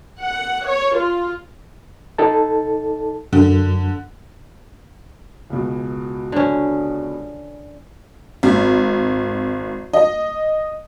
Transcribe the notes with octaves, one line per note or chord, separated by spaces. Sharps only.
F#5
C#5
F4
D#4 A4 A5
F#2 D3
C#2 B2
D3 C#4
G#1
D#5